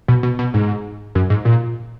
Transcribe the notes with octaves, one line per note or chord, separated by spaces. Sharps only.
B2
B2
B2
G#2
F#2
G#2
A#2